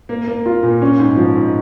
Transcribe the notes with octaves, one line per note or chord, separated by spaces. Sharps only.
A#3
A#3
F4
A#2
C#4
G#2
F3
G#2